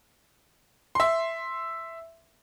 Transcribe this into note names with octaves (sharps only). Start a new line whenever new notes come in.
E5 C6